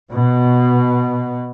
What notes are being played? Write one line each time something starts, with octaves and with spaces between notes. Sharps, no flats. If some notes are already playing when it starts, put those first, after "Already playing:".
B2